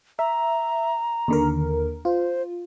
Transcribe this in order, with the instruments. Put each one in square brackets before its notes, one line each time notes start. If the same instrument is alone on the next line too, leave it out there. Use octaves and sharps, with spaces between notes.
[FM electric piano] E5 [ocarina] A#5
[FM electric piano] D#2 D3 A#4
[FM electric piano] F4 [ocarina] C5